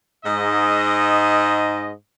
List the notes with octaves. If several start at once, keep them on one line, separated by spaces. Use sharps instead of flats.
G#2 D#5